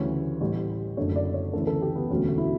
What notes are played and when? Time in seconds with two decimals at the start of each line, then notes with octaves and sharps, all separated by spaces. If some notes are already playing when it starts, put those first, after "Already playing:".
Already playing: D2 C#3 E3 G3 C#5
0.41 A1 A2 G3
0.97 F#1 F#2 D3 A3 C#5
1.16 D5
1.34 C#5
1.53 D2 C#3 E3 A4
1.67 A4
1.82 G4
1.95 B3
2.10 E1 D2 D3 F#3 A3 C#4
2.29 F#4
2.38 E4